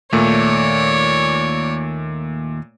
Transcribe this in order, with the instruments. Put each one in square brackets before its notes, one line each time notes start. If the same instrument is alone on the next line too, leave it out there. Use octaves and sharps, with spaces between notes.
[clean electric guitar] D#2 [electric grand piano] A#2 A3 [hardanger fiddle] C#5 D5